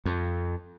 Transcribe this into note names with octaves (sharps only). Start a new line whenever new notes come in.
F2